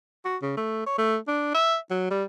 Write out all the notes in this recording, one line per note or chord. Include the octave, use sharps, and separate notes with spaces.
F#4
C#3
A3
C#5
A3
D4
E5
F#3
G3